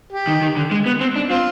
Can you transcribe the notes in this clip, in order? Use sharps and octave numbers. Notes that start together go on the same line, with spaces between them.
G4
D#3
D#3
D3
G#3
B3
C4
D4
C4 F4